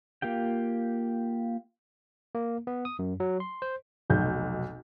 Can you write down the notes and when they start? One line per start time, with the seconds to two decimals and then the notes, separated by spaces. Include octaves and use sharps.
0.22 A#3 F4 G4 G5
2.35 A#3
2.67 B3
2.85 D#6
2.99 F#2
3.20 F#3
3.40 C6
3.62 C5
4.10 F1 B1 G6